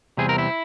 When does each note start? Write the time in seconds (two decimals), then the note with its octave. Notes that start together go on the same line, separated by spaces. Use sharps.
0.17 E2 C3 G3 C4 G#4
0.29 A#4
0.38 E4